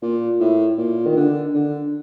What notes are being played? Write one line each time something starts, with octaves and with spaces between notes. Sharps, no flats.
A#2
A2
A#2
D#3
D3
D3